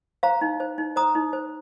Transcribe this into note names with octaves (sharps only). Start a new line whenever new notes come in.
C5 F5 A#5
D#4
C5
D#4
C5 A#5 D#6
D#4
C5